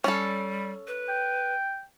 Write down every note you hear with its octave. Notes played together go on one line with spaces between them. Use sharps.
G3 C#4 A4
B4
G5